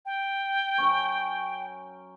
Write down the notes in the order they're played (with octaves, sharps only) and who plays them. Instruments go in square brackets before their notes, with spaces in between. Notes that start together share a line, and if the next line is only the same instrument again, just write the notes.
[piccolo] G5
[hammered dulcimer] F#2 C#4 C#6